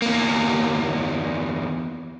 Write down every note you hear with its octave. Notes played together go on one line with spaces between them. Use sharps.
E2 A#3